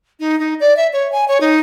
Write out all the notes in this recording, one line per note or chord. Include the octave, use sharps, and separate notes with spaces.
D#4
D#4
D5
E5
C#5
G#5
C#5
D#4